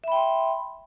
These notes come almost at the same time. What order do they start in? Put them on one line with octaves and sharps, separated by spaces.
E5 B5 G5 C6